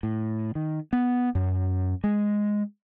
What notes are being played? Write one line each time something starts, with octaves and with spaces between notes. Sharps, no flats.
A2
D#3
B3
F#2
G#3